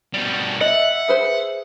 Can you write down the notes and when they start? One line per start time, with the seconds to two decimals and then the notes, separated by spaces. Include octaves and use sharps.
0.14 B2 G3
0.61 D#5 E5 F#5
1.08 G#4 B4 C5